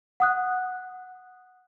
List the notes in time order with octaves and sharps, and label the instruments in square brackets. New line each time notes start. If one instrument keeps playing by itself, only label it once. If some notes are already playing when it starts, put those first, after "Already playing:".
[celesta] F#5 D#6 F#6